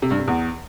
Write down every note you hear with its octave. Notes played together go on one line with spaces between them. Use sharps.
C3
G2
C3
E2